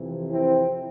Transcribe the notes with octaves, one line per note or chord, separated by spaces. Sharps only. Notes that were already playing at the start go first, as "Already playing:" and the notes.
Already playing: F2 C3 E3
C4 E4